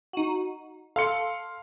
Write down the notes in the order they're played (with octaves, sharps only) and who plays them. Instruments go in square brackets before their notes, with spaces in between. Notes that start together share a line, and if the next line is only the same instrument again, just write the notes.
[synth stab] D#4 F#4
[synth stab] A4 [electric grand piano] F5 C6 C#7